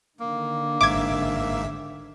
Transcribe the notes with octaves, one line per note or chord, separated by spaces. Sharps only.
D3 D#3 A#3
G#1 G#2 E5 D6 G#6